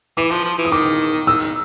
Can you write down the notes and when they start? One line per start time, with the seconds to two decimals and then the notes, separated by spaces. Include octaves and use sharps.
0.17 E3 D6
0.31 F3
0.44 F3
0.58 E3
0.65 D#6
0.72 D#3 D6
1.27 D#3 E6